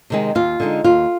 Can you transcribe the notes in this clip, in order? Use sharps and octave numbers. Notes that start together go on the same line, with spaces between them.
C3 D#3 G#3
D#2 F4
D3 G#3 D#4
D#2 F4